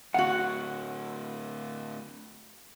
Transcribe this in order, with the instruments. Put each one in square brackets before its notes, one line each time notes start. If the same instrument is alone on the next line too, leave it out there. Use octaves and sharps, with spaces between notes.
[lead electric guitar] A2 D3 [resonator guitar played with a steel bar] F#4 F5 [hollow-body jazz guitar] F#5